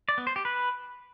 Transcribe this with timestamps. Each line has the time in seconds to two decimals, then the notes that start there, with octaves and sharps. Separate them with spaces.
0.09 D5
0.18 B3
0.27 C5
0.36 G4
0.45 B4